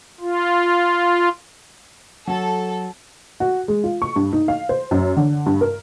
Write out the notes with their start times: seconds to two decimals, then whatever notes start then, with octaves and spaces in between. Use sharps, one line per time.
0.21 F4
2.27 F#3 A4
3.40 F#4
3.68 G#3
3.84 F4
4.02 C#6
4.16 G2
4.33 D#4
4.48 F5
4.69 C5
4.91 F#2
5.17 D3
5.46 G2
5.61 A#4